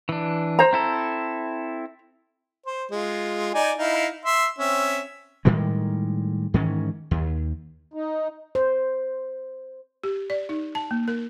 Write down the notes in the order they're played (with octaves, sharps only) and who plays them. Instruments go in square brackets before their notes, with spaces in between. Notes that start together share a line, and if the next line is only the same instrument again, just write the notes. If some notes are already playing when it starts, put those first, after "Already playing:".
[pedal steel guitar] E3 D4
[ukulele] C5 A#5
[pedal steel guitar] C4 E4 A4
[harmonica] C5
G#3 F4
D#4 D5 G#5
D#4 E4 F5
E5 C6
C4 C#4 E5
[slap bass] A2 D#3 G3 G#3
G#2 D#3 E3 C#4
D#2
[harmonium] D#4
[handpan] C5
[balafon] G4
D5
D#4
A5
A#3
A#4